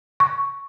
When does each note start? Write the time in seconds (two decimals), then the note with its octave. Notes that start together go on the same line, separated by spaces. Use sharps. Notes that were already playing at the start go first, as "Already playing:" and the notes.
0.20 C#6